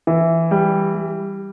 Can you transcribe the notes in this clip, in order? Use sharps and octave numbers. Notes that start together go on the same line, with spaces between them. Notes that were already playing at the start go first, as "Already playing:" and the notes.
E3
G3
G3